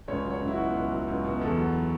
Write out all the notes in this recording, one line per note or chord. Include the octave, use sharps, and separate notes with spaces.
C#2 C#5
F#3
C#5
C#2
E4
F#4
B2
C#2
F#3
C#2
B2
E2 A4
F#3